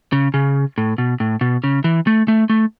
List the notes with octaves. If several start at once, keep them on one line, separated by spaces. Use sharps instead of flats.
C#3
C#3
A2
B2
A2
B2
C#3
E3
A3
A3
A3